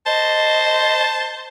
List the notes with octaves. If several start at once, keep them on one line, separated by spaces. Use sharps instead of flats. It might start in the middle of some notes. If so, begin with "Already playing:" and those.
C5 D#5 A5